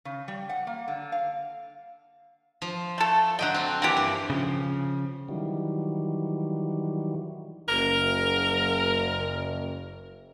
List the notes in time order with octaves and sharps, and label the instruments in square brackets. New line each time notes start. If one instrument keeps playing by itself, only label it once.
[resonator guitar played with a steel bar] C#3
G3
F#5
A#3
D3
F5
[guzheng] F3
[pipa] A3 A4
[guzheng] D3 F#3 G5 [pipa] D#5 F#5
[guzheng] C4 D4
[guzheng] E3 F#5 [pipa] A#3 G4
[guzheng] G2
[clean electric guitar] C#3 F3
[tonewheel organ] D#3 E3 F#3 G3
[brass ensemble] F#1 [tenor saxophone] A#4